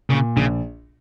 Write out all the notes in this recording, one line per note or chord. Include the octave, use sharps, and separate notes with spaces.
A#2 C#3
A#1 C#3